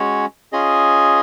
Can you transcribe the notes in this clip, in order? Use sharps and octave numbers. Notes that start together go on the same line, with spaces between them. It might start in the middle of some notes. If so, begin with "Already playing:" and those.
Already playing: G#3 C#4 F#4 C#5
C#4 F4 G#4 D#5 G#5